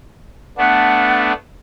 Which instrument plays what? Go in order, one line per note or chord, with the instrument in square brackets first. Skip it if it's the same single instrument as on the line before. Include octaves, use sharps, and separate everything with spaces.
[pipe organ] A3 B3 D4 [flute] F#5